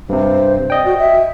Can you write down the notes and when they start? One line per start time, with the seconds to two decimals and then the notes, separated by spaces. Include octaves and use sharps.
0.09 G2 C3 C5
0.70 D5 D#5 G5
0.85 F#4
0.98 E5